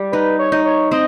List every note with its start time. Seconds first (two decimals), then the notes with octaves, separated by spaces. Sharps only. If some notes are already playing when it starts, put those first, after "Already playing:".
Already playing: G3
0.12 D#4 B4
0.39 C#5
0.52 D#4
0.65 C#5
0.91 C4 D#5